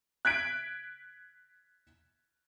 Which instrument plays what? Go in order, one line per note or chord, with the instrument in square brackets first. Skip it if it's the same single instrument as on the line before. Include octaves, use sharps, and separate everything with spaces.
[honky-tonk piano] F#6 G#6 B6 D7